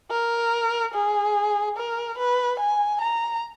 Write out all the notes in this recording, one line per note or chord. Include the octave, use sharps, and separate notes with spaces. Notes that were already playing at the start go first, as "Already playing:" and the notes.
A#4
G#4
A#4
B4
G#5
A#5